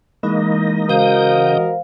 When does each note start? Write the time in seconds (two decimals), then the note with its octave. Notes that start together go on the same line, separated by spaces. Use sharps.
0.23 E3 G#3 A#3 D#4 D#5
0.89 C#3 F#4 A#4 C5 D#5 F5 D#6 G6